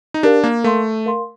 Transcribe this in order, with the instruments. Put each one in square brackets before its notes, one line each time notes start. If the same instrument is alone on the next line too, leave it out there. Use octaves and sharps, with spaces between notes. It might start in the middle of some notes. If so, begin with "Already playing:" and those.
[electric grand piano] D#4
[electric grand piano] D4 [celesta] G4 A#4 F5
[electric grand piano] A#3
[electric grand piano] A3 [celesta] A#4 F5 C6
[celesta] A#4 F5 C6